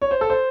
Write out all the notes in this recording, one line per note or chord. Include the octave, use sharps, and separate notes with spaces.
C#5
C5
A4
C5